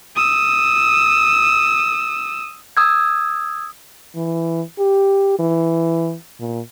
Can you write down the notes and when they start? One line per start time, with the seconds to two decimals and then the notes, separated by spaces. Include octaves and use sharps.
0.16 D#6 E6
2.77 D#6 E6 G#6
4.15 E3
4.79 G4
5.39 E3
6.40 A#2